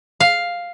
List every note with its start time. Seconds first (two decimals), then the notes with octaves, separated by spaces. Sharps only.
0.20 F5